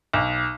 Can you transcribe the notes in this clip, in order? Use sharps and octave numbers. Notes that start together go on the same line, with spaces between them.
B1